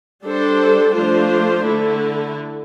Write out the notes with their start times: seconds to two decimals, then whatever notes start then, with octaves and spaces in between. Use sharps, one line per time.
0.24 G3 D4 A4 C5
0.95 F3 A3 D4 F4 C5
1.65 D3 A3 E4 A4